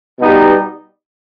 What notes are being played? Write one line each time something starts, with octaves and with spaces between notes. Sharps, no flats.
B2 G3 B3 D#4 G4